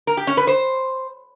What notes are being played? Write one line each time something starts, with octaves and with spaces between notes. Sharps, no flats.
A#4
G4
C#4
B4
C5